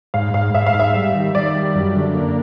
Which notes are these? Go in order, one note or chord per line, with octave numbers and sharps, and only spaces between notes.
G#2 F5
G#2 F5
G#2 E5
F5
G#2
E5
G3
D#3
D#3 D5
G3
F#2
D3
A#3